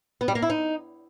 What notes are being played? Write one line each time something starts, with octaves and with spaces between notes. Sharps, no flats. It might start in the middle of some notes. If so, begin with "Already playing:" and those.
B3
G3
A#3
E4
D#4